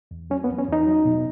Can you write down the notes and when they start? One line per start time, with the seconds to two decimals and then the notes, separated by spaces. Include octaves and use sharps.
0.11 E2
0.30 F#3 C#4
0.44 B3
0.50 E2
0.58 C#4
0.68 E2 D#4
0.87 F#3
1.05 B2